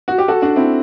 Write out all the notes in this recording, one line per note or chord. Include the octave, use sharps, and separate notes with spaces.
F#4
G4
F#4 A4
D4 F#4
C4 E4